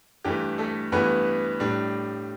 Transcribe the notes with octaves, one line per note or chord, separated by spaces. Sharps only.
G2 E3 A3 G4
A3 A4
G2 E3 A3 B3 B4
A2 G3 D4